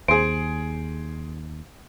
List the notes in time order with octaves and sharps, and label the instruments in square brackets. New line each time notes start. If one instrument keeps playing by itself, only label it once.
[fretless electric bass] D#2 [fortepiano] G#4 C5 [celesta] D7